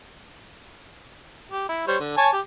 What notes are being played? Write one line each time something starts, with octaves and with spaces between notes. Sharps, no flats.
G4
E4
G3 C5 C#5
D3
C#5 G#5 A5
G4